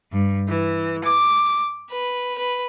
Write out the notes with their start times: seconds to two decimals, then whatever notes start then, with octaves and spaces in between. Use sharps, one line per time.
0.11 G2
0.47 E3
1.05 D6
1.88 B4
2.37 B4